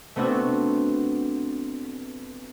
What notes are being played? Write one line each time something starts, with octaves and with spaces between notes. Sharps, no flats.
A3 B3 C4 D4 F#4